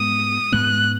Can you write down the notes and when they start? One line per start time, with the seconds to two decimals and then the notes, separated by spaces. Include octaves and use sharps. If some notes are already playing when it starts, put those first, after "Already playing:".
Already playing: G#2 G#3 B3 D#6
0.52 G#2 G#3 B3 F#6